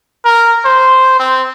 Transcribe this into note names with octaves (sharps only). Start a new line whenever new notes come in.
A#4
C5
C4